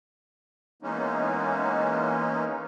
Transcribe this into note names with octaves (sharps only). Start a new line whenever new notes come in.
E3 G#3 A#3 B3 C#4 D#4